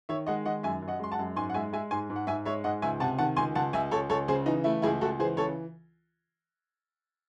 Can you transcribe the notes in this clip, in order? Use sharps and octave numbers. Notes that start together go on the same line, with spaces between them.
D#3 C#5 E5
G#3 D#5 F#5
D#3 D#5 F#5
F#2 E5 G#5
F#2
D#5 F#5
G#3 C6
F#5 A5
F#2
G#2 G#5 C6
F#5
G#3 E5 G#5
G#3 E5 G#5
G#2 G#5 C6
G#2
F#5
G#2 E5 G#5
G#3 C#5 E5
G#2 D#5 F#5
C#2 E5 G#5
C3 F#5 A5
D#3 F#5 A5
C#2 G#5 C6
C#2 F#5 A5
C#2 E5 G#5
C#2 A4 C#5
C#2 A4 C#5
C#3 G#4 C5
E3 D#4
A3 E4
C#2 E4 G#4
C#2 F#4 A4
E3 G#4 C5
C#3 A4 C#5